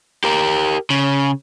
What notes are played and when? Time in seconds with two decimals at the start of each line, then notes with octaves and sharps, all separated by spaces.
0.24 G4 A#4
0.90 C#3